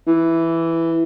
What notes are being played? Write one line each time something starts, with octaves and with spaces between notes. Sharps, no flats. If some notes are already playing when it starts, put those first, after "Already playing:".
E3